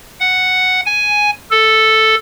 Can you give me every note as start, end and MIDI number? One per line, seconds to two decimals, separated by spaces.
0.20 0.81 78
0.86 1.30 80
1.51 2.15 69